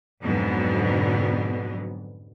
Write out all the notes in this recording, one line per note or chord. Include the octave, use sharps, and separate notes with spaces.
F2 G#2 B2 D3 F#3 B3